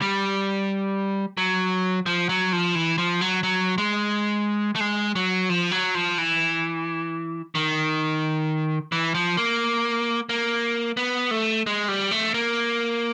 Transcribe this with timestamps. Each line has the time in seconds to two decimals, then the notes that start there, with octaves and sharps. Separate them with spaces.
0.02 G3
1.37 F#3
2.06 F3
2.29 F#3
2.53 F3
2.75 E3
2.98 F3
3.21 F#3
3.43 F#3
3.78 G#3
4.76 A3
4.80 G#3
5.16 F#3
5.50 F3
5.71 F#3
5.95 F3
6.18 E3
7.55 D#3
8.92 E3
9.15 F3
9.37 A#3
10.29 A#3
10.97 B3
11.31 A3
11.66 G#3
11.88 G3
12.11 A3
12.34 A#3